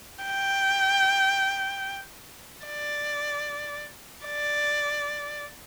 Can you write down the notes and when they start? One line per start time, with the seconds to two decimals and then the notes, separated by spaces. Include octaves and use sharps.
0.25 G5
2.66 D5
4.26 D5